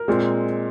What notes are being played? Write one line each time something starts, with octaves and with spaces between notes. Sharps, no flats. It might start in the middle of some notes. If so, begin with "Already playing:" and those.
Already playing: A#4
A#2 G#3 C4